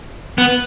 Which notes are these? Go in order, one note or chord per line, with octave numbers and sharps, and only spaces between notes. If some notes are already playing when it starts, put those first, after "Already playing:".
B3